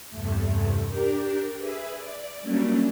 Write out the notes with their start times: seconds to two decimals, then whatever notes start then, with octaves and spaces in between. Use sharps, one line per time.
0.10 E2 G2 C3 A3
0.85 D4 G4 A#4
1.55 G#4 B4 E5
1.91 D5
2.41 F#3 G3 A3 A#3 C#4 D4